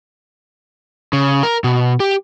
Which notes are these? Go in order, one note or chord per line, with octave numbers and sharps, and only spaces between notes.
C#3
A#4
B2
G4